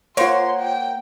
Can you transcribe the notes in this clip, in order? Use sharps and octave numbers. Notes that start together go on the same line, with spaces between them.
A#3 F4 C5 C#5 F#5 C6
G5